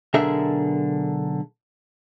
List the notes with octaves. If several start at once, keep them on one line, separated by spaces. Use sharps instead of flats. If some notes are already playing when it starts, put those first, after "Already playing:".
B1 D3 G#4 A#4 E5